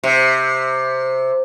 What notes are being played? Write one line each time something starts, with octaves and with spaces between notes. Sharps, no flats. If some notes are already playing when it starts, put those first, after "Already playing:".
C3